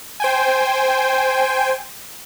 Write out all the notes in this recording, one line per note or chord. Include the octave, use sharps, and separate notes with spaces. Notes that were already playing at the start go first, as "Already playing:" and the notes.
C5 G5 G#5